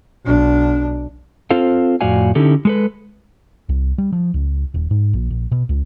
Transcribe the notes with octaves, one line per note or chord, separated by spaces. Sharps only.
B1 D4
C4 F4 A4 C5 F5
F2 A2 F#4 D5 F5 G#5
D3 C#4 D#4 E4 G4 A4
G#3 A4 B4
C2
G3
F3
C#2
D#1
G#2
A#1
A#1
B2
C#2